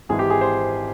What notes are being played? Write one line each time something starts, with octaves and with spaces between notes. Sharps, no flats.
G#1 G#2 E3 G#3 G#4
G4
G#4
C5